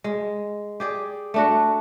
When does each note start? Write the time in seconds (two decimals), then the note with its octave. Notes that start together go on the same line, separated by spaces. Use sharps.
0.04 G#3
0.80 G4 G#4 D5
1.34 A3 D4 F#4